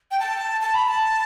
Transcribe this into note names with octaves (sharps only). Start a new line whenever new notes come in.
G5
A5
A5
B5
A5